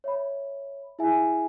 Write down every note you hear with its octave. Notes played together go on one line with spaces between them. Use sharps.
C#5 E5 B5
E4 G#4 E5 G#5